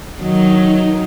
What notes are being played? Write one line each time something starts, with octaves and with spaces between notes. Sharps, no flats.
D#3 F#3 D#4